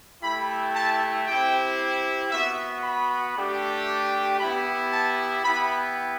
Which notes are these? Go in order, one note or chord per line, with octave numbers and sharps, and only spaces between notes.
A3 E4 G4 B5
A5
C4 E4 G4 G5
B3 F#4 E5
B5
A3 D4 G4
B3 E4 G4 B5
A5
B3 E4 G4 B5